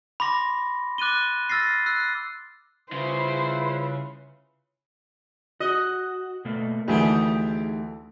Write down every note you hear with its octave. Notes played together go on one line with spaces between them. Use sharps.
B5 C6 D6 A#6
D6 F#6 A6 D#7 G7
E6 F6 A6 A#6 C7
E6 F#6 C7
C#3 G3 E4 F4 B4 C5
F#4 D#5
B2 A3 A#3
D2 D#3 E3 A3 G4 G#4